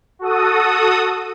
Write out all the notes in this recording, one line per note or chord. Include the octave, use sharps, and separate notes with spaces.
F#4 A4 D#6